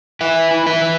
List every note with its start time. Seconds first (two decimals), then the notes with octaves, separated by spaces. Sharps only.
0.21 E4 B4 E5
0.51 E4
0.66 B4 E5
0.82 E3